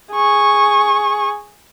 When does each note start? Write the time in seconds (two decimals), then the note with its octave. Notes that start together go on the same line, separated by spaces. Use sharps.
0.12 G#4 C#6